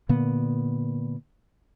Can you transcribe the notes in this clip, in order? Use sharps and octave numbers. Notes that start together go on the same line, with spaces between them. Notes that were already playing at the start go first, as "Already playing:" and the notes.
A#2 D3 A#3 B3